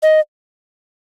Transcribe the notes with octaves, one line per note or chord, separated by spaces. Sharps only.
D#5